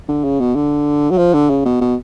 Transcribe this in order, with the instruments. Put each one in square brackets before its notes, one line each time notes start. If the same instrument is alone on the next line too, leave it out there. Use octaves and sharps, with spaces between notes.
[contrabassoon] D3
C#3
B2
D3
F#3
F3
D3
C#3
B2
B2